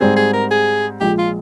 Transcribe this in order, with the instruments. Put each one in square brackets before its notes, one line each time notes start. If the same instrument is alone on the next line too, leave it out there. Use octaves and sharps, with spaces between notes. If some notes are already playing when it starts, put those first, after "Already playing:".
[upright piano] G#2 G3 C4 [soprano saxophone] G#4
[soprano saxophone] G#4
A#4
G#4
[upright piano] A#1 A#2 F3 G#3 [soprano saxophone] G4
[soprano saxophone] F4